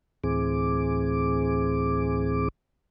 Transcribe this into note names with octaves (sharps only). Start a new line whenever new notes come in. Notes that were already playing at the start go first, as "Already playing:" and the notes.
D2 A2 E3 C4 G#4 D6